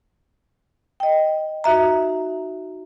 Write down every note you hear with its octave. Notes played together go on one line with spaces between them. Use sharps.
D#5 G5
D#4 F#4 E5 A#5